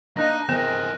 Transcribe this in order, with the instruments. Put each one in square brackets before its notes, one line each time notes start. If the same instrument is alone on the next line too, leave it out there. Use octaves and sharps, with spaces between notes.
[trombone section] A#3 D#4 [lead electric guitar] D4 A#5 [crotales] F#6 A#6
[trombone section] F2 G#4 C5 [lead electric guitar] E3 A#4 [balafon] B3